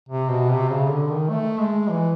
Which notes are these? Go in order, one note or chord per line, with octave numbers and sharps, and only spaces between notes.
C3
B2
C3
C#3
D3
D#3
A3
G#3
E3